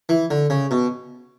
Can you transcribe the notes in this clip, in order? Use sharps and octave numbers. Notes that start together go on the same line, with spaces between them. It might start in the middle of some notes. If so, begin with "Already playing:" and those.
E3
D3
C#3
B2